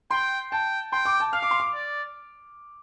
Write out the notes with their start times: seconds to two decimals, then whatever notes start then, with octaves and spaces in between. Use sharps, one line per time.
0.11 G5 C6
0.52 G5 A5
0.92 G5 C6
1.05 D6
1.20 A5
1.33 F5 F6
1.42 D6
1.51 C6
1.60 D6
1.74 D5